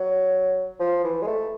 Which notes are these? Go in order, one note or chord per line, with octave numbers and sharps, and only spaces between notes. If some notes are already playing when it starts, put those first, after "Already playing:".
Already playing: F#3
F3
E3
G#3
A3